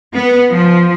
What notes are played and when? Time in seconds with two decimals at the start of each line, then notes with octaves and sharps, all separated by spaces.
0.14 B3
0.52 F3